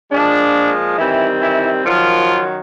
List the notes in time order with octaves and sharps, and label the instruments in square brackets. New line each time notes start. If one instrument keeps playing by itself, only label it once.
[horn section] A#2 F3 G#3 D4
D#3 E3 G3 C4 E4
E3 E4
F#2 D#3 F3 F#3 F4